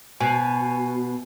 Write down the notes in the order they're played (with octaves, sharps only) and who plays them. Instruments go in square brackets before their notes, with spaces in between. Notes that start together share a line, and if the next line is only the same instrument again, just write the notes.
[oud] B2 [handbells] G#5